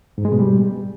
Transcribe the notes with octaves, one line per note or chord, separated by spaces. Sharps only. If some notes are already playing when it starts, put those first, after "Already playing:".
G#2
G#3
B2
G3